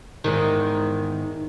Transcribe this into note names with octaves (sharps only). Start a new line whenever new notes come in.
E2 G#2 D#3